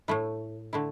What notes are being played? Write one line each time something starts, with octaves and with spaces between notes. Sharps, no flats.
A2 A3 E4
D3 A3 E4